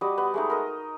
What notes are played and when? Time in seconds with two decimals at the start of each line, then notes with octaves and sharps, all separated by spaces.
0.01 G3 F#4 D5 D#5
0.18 B3
0.34 G#3 A3 D#4
0.50 A#4 D#5